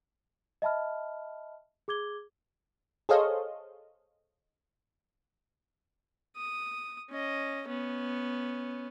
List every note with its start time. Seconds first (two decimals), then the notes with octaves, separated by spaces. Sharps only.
0.62 D#5 E5 A5 B5 F6
1.88 G#4 D6 G#6 G7
3.09 G#4 A4 C5 C#5 D#5 F5
6.36 D#6
7.10 C#4 D#5
7.68 B3 C#4